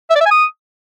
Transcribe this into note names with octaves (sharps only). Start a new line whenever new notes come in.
E5
D5
E5
G#5
D#6